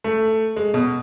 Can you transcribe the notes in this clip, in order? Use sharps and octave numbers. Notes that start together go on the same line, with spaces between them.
A3
G#3
B2